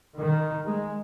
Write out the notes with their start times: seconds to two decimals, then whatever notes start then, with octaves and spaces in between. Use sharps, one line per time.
0.18 D#3
0.67 G#3